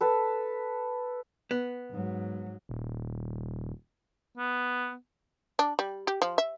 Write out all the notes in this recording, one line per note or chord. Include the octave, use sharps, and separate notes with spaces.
A4 B4 A5
B3
G#2 F#3
D#1
B3
D4
G3
G4
F3
E5